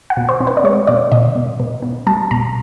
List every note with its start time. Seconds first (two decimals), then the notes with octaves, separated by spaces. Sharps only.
0.10 F#5
0.17 B2
0.29 C5
0.40 C4
0.47 B4
0.57 D5
0.64 G#3 C#5
0.87 B2 D5
1.12 B2 D#5
1.36 B2
1.60 B2
1.82 B3
2.07 G3 A5
2.31 B2 A#5